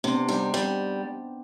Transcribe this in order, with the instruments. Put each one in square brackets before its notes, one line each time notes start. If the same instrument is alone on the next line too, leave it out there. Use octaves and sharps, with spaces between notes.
[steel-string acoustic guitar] C3 [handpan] B3 D4
[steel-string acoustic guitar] G3 [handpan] C4 D#4
[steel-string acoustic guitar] G3